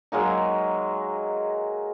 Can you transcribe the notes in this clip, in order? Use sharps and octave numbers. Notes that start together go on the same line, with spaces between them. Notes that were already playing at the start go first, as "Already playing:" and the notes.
F#3 G#3 A#3 D#4